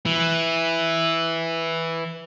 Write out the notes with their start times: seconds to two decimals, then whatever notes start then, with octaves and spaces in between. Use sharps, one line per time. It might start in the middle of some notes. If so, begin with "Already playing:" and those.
0.06 E3